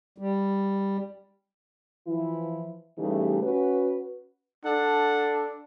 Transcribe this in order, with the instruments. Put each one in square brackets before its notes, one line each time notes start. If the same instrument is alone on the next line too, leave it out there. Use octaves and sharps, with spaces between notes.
[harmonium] G3
[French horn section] E3 F3 E4
C#3 E3 G3 A3 D#4 G4
C#4 F#4 B4
[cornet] D4 [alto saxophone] A4 [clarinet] F#5